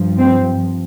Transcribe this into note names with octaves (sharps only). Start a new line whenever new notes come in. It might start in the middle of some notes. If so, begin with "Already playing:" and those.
Already playing: G2 F3
C4